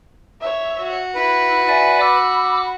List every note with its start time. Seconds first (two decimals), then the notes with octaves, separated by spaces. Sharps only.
0.40 C#5 E5
0.79 F#4
1.15 E4 B4
1.68 D5 E5 G#5
2.00 B5 D6 E6